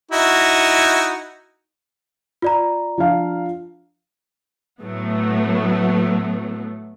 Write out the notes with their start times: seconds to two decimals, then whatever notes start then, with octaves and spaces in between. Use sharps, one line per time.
0.11 D#4 E4 F#4
2.42 F4 D5 A#5
2.98 F3 D4 F5
4.81 A2 F#3 A3 B3